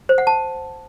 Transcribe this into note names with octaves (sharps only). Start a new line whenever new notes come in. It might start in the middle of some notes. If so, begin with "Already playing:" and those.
C5
F#5
A5